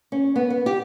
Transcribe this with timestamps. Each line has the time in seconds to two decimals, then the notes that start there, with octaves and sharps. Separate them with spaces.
0.12 C#4
0.36 B3
0.50 B3
0.66 G4